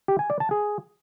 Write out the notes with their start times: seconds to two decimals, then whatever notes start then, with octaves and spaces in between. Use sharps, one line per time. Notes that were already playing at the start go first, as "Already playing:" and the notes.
0.08 G4
0.19 G#5
0.30 D5
0.40 A5
0.51 G#4